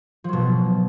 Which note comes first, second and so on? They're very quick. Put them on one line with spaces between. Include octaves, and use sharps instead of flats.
F3 F#3 B2